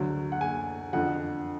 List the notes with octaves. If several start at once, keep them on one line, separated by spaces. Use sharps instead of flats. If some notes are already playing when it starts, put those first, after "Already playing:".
Already playing: D2 D3 F#3
F#5
G#5
F2 D3 F3 F#5